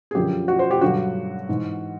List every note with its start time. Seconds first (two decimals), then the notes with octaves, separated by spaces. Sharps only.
0.11 G#4
0.15 F#2 D3 F3 G4
0.48 F#4
0.59 C5
0.71 G4
0.81 G2 D3 F#3 F#4
1.49 G#2 E3